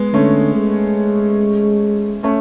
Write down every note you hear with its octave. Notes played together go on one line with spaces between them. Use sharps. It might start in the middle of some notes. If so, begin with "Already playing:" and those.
Already playing: G#3 B3
D3 A3 C#4
G#3
A3 C#4